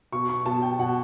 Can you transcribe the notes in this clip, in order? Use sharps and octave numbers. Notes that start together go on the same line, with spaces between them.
B2 C#6
C#6
B2 A5
G5
B2 F#5